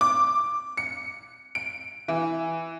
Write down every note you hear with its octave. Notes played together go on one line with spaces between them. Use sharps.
D6
C#7
D7
E3